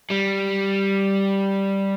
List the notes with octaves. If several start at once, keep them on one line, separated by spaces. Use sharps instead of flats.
G3